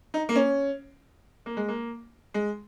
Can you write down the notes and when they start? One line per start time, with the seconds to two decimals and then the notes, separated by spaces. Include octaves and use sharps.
0.14 D#4
0.29 A#3
0.35 C#4
1.46 A#3
1.57 G#3
1.68 A#3
2.34 G#3